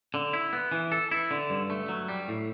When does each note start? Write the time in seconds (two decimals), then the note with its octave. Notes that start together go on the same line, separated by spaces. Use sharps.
0.14 D3
0.33 E4
0.53 B3
0.72 E3
0.92 A4
1.11 E4
1.31 D3
1.50 G2
1.70 A3
1.89 F#3
2.08 G3
2.28 A2